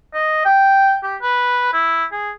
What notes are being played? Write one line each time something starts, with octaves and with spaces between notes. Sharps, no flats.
D#5
G5
G4
B4
E4
G#4